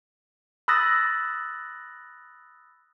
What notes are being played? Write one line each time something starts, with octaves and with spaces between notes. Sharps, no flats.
B5 D#6 E6 F#6 A6 A#6